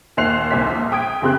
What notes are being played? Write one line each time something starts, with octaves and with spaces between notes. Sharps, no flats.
D#2 A#2 C5 F#6 C7 F7
C2 A#2 C5 B6
A#1
G5 D#6 G#6 D7
F2 C#3 C4 G4 C6 F#6